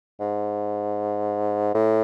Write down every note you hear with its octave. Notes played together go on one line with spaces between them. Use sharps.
G#2
A2